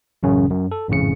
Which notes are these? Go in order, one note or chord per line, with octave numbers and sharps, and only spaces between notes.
A1 F#2 C#3 C#4
F#2
A4
G#1 F2 A2 C#3 C#7